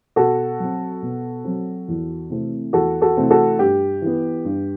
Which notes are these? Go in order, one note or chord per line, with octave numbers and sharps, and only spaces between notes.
B2 F#4 A4
F#3 C4
B2
F#3 C4
E2
C3 E3 A3 C4
E2 F#4 A4
F#4 A4
C3 E3 A3 C4
F#4 A4
G2 G4
E3 B3
G2